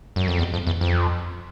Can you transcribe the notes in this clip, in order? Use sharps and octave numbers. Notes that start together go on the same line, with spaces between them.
F#2
F2
E2
F2
E2
F2